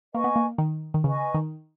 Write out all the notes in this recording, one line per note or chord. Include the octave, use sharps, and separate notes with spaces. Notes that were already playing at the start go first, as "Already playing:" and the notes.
A#3 B4 D#5 G#5 C#6
B3
A#3
D#3
D#3
C#3 B4 D#5 G#5 C#6
D#3